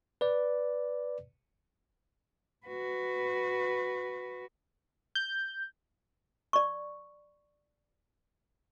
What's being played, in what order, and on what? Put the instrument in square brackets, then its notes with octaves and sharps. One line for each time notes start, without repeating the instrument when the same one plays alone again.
[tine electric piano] B4 D5
[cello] F#4 B4
[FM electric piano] G6
[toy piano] D5 C#6